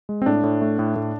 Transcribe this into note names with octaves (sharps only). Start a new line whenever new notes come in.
G#3
C4
A2 D4
A2
A3
A2
A2